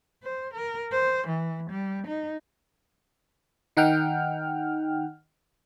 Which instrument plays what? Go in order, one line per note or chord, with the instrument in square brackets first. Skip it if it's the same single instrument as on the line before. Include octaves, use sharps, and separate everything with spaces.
[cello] C5
A#4
C5
E3
G3
D#4
[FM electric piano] D#3 D#4 F#5 G5 F6